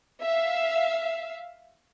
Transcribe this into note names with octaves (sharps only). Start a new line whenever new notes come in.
E5 F5